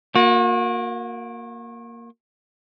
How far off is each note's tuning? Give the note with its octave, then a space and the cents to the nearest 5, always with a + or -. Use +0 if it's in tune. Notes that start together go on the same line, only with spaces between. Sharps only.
A#3 +0 F#4 -40